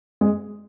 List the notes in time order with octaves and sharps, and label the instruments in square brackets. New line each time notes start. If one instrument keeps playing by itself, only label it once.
[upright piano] G#3